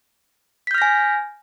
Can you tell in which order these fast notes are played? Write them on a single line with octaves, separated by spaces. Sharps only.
B6 G6 F6 A#6 G#5